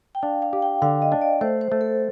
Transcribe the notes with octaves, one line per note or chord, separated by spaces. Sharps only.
G5
D4 F5
F5
G4
G5
D3 F5
D#5
D4
D5
A3 C5
C5
A3
A4